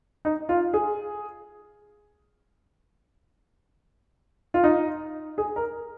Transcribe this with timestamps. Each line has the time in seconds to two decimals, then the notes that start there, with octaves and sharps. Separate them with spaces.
0.25 D#4
0.49 F4
0.74 G#4
4.54 F4
4.64 D#4
5.38 G#4
5.56 A#4